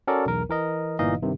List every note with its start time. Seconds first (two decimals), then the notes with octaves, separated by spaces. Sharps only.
0.07 C#4 F#4 A4 A#4 D5
0.26 B1 E2 A#4
0.49 E3 A#4 D#5
0.99 G1 A#2 E3 D#4 D#5 F5
1.22 G2 C3 D#3